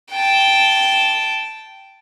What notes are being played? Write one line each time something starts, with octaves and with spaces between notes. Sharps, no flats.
G5 A5